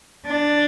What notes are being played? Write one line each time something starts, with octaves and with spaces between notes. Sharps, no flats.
D4